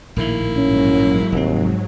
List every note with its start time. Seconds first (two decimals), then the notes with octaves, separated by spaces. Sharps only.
0.16 A#1 A2 D#3 A#3 E4
0.57 G#2 F#3 C#4
1.32 F1 D#2 C4